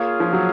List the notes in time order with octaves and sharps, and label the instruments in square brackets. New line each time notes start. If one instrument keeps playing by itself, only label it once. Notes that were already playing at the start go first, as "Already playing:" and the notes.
Already playing: [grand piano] A#3 [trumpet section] F4 G#4 C#5 F5
[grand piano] F3
F#3